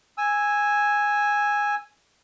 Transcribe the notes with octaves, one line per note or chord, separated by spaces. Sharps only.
G#5 E6